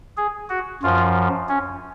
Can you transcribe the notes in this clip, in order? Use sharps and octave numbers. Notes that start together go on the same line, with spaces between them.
G#4
F#4
F#2 F3 F4
C#4